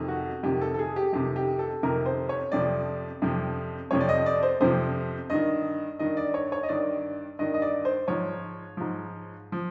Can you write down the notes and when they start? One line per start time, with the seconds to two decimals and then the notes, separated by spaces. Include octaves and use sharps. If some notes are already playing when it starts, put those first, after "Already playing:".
Already playing: F2 C3 D#3
0.08 F#4
0.43 F2 C3 D#3 G4
0.61 A4
0.74 A4
0.79 G#4
0.96 G4
1.13 F2 C3 D#3 G4
1.36 G4
1.59 A4
1.83 F2 C3 D#3 A#4
2.06 C5
2.29 C#5
2.52 F2 C3 F3 D5
3.22 F2 C3 F3
3.91 F2 C3 F3 C#5
4.01 D5
4.09 D#5
4.26 D5
4.43 C5
4.60 F2 C3 F3 C5
5.30 G2 D#3 D#5
5.99 G2 D#3 D#5
6.17 D5
6.34 C#5
6.52 C#5
6.63 D#5
6.69 G2 D#3 D5
7.39 G2 D#3 D#5
7.54 D#5
7.62 D5
7.85 C5
8.08 G#2 F3 C#5
8.77 G#2 F3
9.52 F3